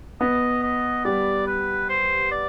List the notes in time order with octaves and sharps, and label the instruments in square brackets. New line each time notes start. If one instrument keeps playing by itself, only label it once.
[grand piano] B3 [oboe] D#5
[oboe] D#5
[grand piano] G3 [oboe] D5
[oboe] B4
C5
D5